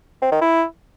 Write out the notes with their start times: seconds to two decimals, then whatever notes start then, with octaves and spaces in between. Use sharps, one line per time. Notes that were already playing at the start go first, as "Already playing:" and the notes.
0.22 C4
0.32 D#3
0.41 E4